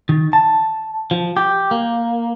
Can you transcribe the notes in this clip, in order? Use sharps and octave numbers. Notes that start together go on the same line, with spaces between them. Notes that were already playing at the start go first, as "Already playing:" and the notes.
D#3
A5
F3
G4
A#3